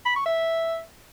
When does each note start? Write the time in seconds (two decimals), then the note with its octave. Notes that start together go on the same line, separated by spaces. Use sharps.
0.05 B5
0.15 C#6
0.26 E5